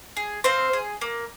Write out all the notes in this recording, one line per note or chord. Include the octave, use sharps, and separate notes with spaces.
G#4
C4 C5 F5
G#4
A#3